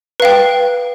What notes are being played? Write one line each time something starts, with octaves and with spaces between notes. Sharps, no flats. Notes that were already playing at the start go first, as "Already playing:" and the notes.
B4 F5 G5